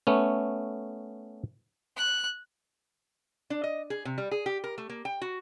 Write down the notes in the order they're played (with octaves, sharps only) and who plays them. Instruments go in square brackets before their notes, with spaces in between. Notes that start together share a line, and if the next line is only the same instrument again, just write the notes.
[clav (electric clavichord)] A3 B3 C#4
[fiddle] F#6
[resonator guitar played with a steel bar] D4
D#5
G#4
C3
G3
G#4
G4
A#4
A3
A#3
G5
F#4